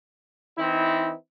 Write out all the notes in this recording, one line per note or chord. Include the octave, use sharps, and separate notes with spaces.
E3 C4 D#4 E4